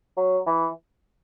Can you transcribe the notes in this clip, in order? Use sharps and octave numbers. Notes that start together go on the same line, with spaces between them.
F#3
E3